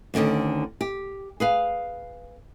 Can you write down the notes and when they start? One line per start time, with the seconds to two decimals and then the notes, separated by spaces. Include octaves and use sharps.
0.14 D2 A2 D3 D#3 C#4
0.81 G4
1.40 G#4 B4 F5